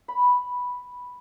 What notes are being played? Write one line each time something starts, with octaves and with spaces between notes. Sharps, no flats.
B5